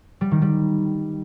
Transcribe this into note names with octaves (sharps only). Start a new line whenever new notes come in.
G3
D#3
G3